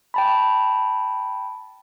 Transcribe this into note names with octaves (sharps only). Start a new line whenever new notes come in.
G5 A5 B5